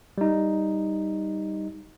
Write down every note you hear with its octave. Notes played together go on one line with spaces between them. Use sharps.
G3 D#4